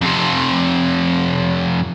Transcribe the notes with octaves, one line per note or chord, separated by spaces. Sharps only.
F2 C3